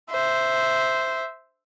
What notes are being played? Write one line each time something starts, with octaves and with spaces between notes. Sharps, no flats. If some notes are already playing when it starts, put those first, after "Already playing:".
C5 E5